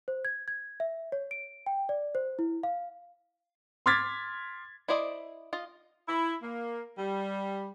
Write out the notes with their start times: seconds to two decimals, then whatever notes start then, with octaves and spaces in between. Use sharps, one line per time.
0.08 C5
0.25 G#6
0.48 G#6
0.80 E5
1.12 C#5
1.31 D7
1.66 G5
1.89 D5
2.15 C5
2.39 E4
2.63 F5
3.86 C6 D6 F6 G#6 A6 B6
4.88 E4 C5 D5 D#5
5.53 F4 D#5
6.08 E4
6.43 A#3
6.98 G3